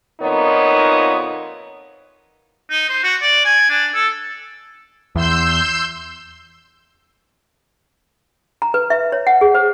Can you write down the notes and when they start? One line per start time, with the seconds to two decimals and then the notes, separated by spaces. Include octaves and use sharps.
0.21 F2 A#2 B3 D#4 A#4 C#5
2.70 D#4
2.89 C5
3.04 F#4
3.22 D5
3.45 G#5
3.70 D4
3.94 A4
5.15 E2 C6 E6 G6
8.62 A#5
8.74 B4
8.90 E5
9.12 C#5
9.27 F#5
9.41 G#4
9.55 C5